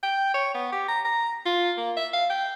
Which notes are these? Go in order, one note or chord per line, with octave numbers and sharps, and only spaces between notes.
G5
C#5
B3
G4
A#5
A#5
F4
A#3
E5
F5
G5